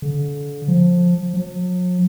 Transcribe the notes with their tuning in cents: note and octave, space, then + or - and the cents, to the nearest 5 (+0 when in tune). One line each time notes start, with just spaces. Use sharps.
D3 -35
F3 +15
F#3 -45